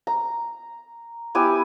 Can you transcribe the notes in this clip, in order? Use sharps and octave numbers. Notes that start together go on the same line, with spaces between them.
A#5
B3 E4 G4 G#5